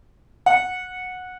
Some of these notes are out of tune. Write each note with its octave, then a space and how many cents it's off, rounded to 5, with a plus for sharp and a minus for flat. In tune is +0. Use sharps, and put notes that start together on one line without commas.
F#5 -15